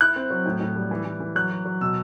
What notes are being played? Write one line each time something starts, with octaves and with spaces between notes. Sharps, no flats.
E4 F#6
C4
F#3
A2
A2
G3
E3
E3
E3
F#3 F#6
F#3
F#3
B2 E6